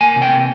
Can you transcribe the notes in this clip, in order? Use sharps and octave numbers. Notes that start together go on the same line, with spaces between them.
A#3 G#5
C3
G5
A#3